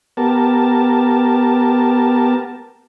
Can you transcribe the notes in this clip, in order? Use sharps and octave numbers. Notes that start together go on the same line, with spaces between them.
B3 G4 A#4 A5